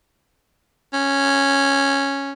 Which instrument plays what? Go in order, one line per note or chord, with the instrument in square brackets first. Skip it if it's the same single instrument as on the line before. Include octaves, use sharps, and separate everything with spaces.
[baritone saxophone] C#4